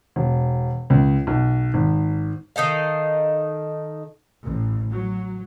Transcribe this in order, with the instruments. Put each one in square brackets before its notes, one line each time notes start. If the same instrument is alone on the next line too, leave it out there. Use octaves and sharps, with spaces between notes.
[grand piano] E1
C#2
B1
G#1
[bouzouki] D#3 D#4 A4 F5
[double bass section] A1
F#3